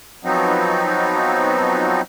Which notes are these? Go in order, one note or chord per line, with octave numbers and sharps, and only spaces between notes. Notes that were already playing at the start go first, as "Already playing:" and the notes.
F3 F#3 B3 C4 D#4